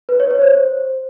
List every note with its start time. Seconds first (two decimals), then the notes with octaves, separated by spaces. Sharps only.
0.09 B4
0.20 C#5
0.31 C#5
0.42 C5